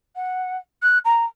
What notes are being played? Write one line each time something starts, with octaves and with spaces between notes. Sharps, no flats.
F#5
F#6
A#5